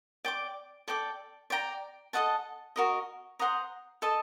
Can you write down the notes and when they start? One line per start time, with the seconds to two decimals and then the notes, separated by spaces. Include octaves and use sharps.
0.25 D5 G5 D6
0.88 A4 D5 G5 D6
1.50 D5 G5 A#5
2.13 A4 D#5 F#5 A5
2.76 F#4 A#4 D#5
3.39 C5 F#5 A#5 D#6
4.02 A4 D#5 A5